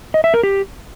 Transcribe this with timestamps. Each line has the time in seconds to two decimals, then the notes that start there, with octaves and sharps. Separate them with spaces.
0.14 D#5
0.24 E5
0.34 A#4
0.43 G4